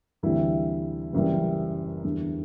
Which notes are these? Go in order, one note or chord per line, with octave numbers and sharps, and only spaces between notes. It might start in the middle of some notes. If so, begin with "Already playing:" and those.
D2 C3 E3 G3 E4
F#1 F#2 E3 G3
E2 D3 G3